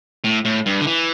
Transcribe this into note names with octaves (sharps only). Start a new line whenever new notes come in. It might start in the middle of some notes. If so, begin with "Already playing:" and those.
A2
A2
G2
D3
E3